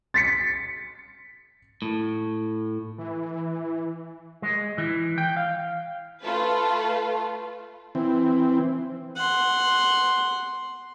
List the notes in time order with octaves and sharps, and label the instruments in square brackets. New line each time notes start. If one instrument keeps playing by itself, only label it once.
[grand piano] A6 B6 C#7
[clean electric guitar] A2
[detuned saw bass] E3
[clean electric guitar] G#3
E3
G5
F5
[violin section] A3 F4 A4 B4
[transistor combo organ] E3 C4
[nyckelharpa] F#5 C6